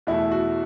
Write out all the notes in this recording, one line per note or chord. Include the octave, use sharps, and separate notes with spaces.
E2 B2 A3 E4
F#4